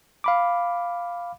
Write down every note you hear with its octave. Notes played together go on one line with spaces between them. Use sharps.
F5 B5 D6